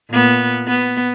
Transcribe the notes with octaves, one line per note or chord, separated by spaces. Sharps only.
A#2 B3
B3